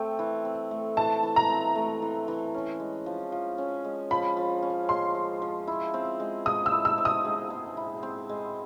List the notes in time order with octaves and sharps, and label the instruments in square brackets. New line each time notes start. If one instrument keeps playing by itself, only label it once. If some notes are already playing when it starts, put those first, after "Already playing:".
Already playing: [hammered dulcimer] A3 C4 [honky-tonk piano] G5
[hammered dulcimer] E3
C4
A3
[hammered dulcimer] E3 [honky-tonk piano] A5
[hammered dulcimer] E3
[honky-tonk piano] A#5
[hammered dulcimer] C4
A3
E3
E3
C#4
G#3
F3
F3
C#4
G#3
[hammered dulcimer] F3 [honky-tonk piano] B5
[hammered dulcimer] F3
C#4
[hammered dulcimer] G#3 [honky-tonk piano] C6
[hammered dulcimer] F3
F3
E4
C4
G#3
[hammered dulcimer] G#3 [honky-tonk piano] D#6
[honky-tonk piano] E6
[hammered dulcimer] E4
[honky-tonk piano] E6
[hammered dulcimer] C4
[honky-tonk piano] D#6
[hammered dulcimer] G#3
G#3
E4
C4
G#3